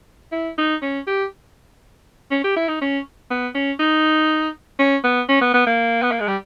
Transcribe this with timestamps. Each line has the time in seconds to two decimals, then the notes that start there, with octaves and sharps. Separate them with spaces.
0.32 E4
0.58 D#4
0.82 C#4
1.07 G4
2.31 C#4
2.44 G4
2.57 E4
2.68 D#4
2.81 C#4
3.31 B3
3.55 C#4
3.79 D#4
4.79 C#4
5.04 B3
5.29 C#4
5.41 B3
5.54 B3
5.67 A#3
6.03 B3
6.12 A#3
6.20 G#3
6.28 G3